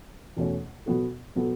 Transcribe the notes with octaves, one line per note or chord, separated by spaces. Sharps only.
E2 B2 A3 C#4
B2 F#3 B3 F#4 A4
B2 F#3 B3 F#4 A4